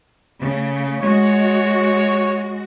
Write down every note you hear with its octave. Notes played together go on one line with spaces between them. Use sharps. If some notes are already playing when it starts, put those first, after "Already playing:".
C#3 A3
G#3 F#4 C#5